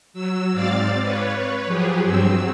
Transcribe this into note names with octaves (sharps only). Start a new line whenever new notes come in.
F#3 E6
G#2 C4 D5 F5 A6
B4 C#5
F3 F#3 G4 G#4
G2 F#3 C4 E6